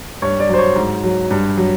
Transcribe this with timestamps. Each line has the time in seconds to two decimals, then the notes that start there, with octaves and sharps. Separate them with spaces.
0.22 G2 C#5
0.40 D5
0.49 F#3 C5
0.59 C#5
0.76 G#2
1.04 F#3
1.31 G2
1.57 F#3